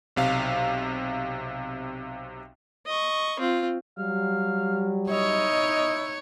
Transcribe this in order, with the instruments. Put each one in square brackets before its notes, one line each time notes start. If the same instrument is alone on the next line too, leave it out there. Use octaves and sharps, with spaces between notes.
[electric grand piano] B1 C3 F5
[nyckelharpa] D#5 C#6
C4 F4
[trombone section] F#3 G3 [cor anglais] F5
[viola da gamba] D#4 C#5 [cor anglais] E4 [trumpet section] D#5